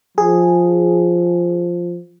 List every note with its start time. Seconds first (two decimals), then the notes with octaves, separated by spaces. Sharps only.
0.18 F3 G#4